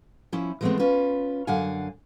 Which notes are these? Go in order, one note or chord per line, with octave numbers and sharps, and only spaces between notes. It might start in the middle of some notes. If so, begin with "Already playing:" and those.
F3 C#4 E4
E3 F3 G#3 A3 B3 C4
C#4 F4 B4
F#2 D3 F5 F#5 G#5